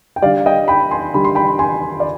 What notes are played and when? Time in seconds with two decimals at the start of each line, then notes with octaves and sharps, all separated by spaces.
0.16 G5
0.22 D3 G3 D5 F5
0.46 D#5 G5
0.68 G5 B5
0.91 G#5 C6
1.14 D3 G3 B5
1.25 C6
1.35 G5 B5
1.59 G#5 C6
2.00 D5